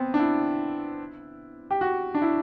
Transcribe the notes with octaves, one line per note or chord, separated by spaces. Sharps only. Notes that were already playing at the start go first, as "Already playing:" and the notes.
Already playing: B3 C4
D4
E4
G4
F#4
D4
E4